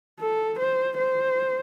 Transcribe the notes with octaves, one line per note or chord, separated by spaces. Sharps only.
A4
C5
C5